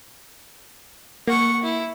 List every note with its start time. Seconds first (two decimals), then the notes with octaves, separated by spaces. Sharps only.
1.28 A#3 F#5 C#6
1.62 E4